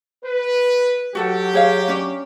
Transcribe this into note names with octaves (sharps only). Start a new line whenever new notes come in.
B4
F#3 F#4 G4 A4 F#5
G#4 C#5 F5
C#4 D4